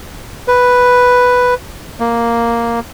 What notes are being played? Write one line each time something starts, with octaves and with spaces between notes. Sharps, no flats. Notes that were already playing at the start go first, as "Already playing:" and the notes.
B4
A#3